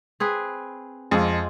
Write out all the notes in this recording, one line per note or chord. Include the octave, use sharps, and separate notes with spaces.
C4 G#4 B4
F2 G#3 F4